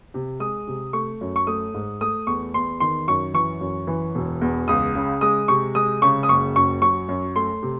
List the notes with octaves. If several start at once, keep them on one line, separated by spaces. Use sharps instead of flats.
C3
G#3 D#6
C3
A3 C#6
F#2
C#6
A3 D#6
G#2
A3 D#6
E2 C#6
E2 C6
D#3 C6
F#2 C#6
E3 C#6
F#2
E3
E1
E2
C#2 D#6
C#3
G#3 D#6
C3 C#6
G#3 D#6
C#3 C#6
D#6
F#1 C#6
F#2 C#6
F#3 C#6
F#2
A3 C6
C3